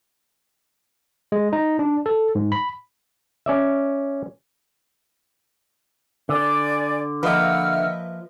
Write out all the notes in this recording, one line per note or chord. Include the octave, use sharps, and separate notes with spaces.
G#3
D#4
D4
A4
G#2
B5
C#4 D5 E5
D3 D5 G#5
F3 A#3 B4 D#5 E5 F#5 E6 F6